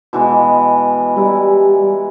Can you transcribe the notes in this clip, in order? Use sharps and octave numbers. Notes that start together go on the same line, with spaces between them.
B2 E3 G#3
G3 E4 A#5